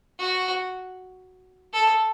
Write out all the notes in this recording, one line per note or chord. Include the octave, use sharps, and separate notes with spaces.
F#4
A4